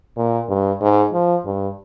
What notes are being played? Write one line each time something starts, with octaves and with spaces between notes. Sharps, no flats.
A#2
G2
G#2
F3
G2